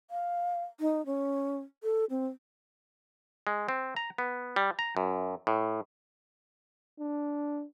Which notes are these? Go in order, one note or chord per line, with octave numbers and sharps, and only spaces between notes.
F5
D#4
C#4
A4
C4
G#3
C4
A#5
B3
G3
A#5
F#2
A2
D4